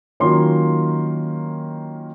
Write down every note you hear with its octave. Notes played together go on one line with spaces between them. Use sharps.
D#3 F#3 A#3 C#4 F4 C6